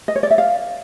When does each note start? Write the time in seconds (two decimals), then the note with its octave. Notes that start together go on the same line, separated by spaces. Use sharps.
0.08 D#5
0.16 C#5
0.23 D5
0.31 E5
0.38 F5